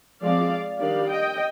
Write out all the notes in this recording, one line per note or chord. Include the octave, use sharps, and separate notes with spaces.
F3 G#3 C4 D5 F5
D#3 G3 D4 D5 F5
D#5 G5